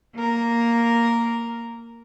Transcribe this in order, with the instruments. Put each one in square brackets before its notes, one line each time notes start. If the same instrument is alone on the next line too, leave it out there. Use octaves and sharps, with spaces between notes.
[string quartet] A#3 A#4